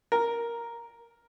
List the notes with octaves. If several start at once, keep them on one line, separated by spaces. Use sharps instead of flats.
A#4